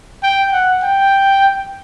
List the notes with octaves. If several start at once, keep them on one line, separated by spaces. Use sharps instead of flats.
G5
F#5
G5